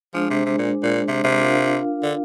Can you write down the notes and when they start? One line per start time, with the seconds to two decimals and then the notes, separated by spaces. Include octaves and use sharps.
0.14 F3 G#3 D4 G#4 C5
0.30 C3
0.46 C3
0.58 A#2
0.83 A#2
1.08 C3
1.24 C3
1.39 D4 F4 A#4 F5
2.03 D3